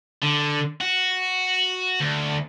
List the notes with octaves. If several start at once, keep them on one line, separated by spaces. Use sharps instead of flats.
D3
F#4
D2